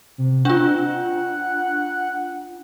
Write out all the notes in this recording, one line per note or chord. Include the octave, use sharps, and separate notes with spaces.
C3
D4 F4 F#5